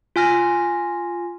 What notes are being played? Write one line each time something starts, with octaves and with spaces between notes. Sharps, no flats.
F4 G#5 F6 A#6